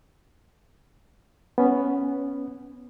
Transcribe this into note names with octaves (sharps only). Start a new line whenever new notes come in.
B3 C#4